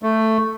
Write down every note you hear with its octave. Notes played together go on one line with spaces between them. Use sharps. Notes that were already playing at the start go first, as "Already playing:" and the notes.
A3